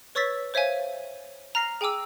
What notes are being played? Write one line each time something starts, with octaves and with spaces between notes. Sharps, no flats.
B4 C#5 C#6 E6 A6 B6
C5 C#5 E5 F5 G#5
A#5 F6 A#6 C7
G#4 G5 G#5 D6 E6